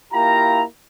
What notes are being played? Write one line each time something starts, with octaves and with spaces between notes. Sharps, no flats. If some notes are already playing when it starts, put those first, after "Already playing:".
A#3 E4 F4 G4 A#5